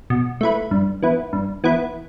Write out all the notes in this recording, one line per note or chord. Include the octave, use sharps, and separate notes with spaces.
B2
A3 E4 B4
G2
E3 B3 E4
G2
E3 B3 E4